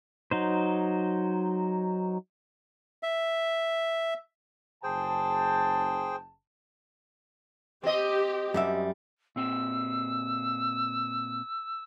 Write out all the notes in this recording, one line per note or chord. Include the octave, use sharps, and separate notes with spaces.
F#3 D#4 C5
E5
F#1 C#3 G#4 C5 G5 A5
C4 G4 D#5
F#2 G3 E5
A#2 C4 E6